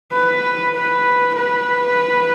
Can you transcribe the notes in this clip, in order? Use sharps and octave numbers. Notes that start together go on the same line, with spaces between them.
B4
B4
B4